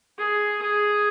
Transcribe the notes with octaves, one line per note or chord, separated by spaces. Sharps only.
G#4
G#4